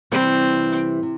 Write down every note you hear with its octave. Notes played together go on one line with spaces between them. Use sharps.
C3 E3 G3 C4
C3